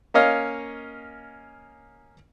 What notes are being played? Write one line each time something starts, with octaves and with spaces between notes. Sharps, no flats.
A#3 C#4 C#5 D#5 F5